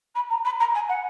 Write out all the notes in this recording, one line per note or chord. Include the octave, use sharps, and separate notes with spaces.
B5
A#5
B5
A#5
G#5
F#5